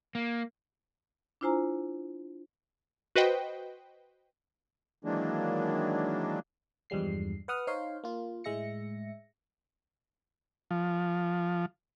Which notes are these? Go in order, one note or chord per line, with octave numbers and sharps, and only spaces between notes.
A#3
D4 E4 F4 C5 G#5 A#5
F#4 B4 C5 D#5 G5
D#3 E3 F#3 G#3 A#3 D4
E2 G2 F3 G3 G#3 C7
B4 F#5 D#6 F6
D#4 C5 C#5 F5 C6
A#3 F4
A2 G#3 E5 A#6 C#7
F3